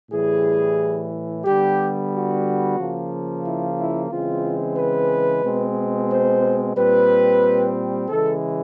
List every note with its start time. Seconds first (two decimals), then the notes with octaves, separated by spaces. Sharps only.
0.11 A2 E3 G3 G#4
1.44 D3 G3 B3 G4
2.11 F#4
2.77 C#3 F3 A#3
3.44 E4
3.77 E4
4.10 C#3 E3 G#3 C4 F4
4.77 B4
5.43 B2 G#3 C4
6.10 C5
6.76 A#2 G3 C4 B4
8.09 C#3 E3 G#3 A4